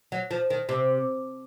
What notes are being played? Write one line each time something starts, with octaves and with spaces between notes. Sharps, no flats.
F#3
F3
D#3
C3